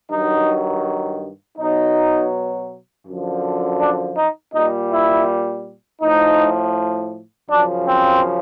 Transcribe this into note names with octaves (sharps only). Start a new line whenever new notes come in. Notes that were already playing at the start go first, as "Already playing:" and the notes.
G2 D#3 F#3 D#4
B2 F#3 D#4
F#2 D3 F3
D4
D#4
A#2 G3 D#4
E4
A2 F3 D#4
F#2 C#3 F3 D4
C4